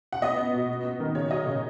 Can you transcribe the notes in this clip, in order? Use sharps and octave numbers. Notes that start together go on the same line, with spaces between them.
F#5
B3 D#5
B3
B2
B3
B3
D#3
C#3 C#5
F#3 D#5
C#3